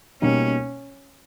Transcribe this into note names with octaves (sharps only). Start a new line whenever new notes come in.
B2 G3 A#3 C#4 D#4